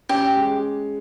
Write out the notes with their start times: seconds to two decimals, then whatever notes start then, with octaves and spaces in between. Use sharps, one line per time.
0.09 C#4 G4
0.36 G#3